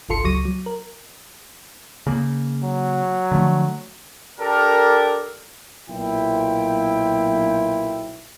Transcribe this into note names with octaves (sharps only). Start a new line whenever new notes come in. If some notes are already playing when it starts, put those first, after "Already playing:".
G1 C2 F4 A4 C6 C#7
C#2 F#3 G3 C#6 A#6 D#7
F#3
A#4
C#3 A#3
F#3
D3 F3 A3
D4 G4 A4 A#4
B1 A#2 E4 G5